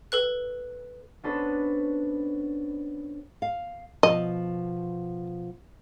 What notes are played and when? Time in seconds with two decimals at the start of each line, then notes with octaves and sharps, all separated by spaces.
0.12 A4 B4 F#6
1.23 B3 C#4 D4 A4 B4 C5
3.42 F5
4.03 B2 F3 D#5